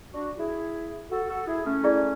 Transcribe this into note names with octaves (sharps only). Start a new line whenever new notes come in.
D4 F#4
E4 G#4
F#4 A4
F#4 A4
E4 G#4
A3 C#4
E4 G#4 D5